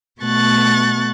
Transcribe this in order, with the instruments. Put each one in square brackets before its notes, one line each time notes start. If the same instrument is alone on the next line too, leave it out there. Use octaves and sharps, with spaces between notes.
[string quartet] B2 A3 C#6 F#6 A6